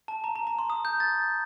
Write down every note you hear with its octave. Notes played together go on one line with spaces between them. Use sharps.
A5
A#5
A#5
A#5
C6
D#6
G6
A6